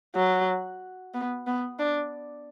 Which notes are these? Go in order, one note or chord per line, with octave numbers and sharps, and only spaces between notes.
F#3
B3
B3
D4